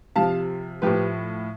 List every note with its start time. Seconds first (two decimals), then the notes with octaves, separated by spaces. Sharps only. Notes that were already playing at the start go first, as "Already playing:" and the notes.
0.16 C3 F3 F5 A5
0.82 A2 F3 G4 B4